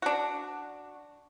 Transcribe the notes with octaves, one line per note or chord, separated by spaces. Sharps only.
D4 F#4